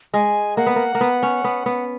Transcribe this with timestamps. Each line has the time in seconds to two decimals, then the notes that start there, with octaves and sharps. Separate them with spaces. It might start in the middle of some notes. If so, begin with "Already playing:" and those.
0.14 G#3 G#5
0.57 A#3 F#5
0.66 B3
0.76 A#3
0.95 A#3
1.01 B3
1.23 C#4
1.44 B3
1.66 B3